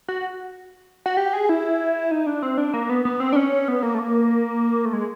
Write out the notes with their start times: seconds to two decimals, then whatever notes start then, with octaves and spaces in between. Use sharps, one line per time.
0.08 F#4
1.06 F#4
1.17 G4
1.33 G#4
1.49 E4
2.11 D#4
2.26 D4
2.42 C4
2.58 D4
2.74 A#3
2.90 B3
3.05 B3
3.20 C4
3.33 D4
3.36 C#4
3.68 B3
3.83 A#3
3.95 A3
3.99 A#3
4.85 A3
4.93 G#3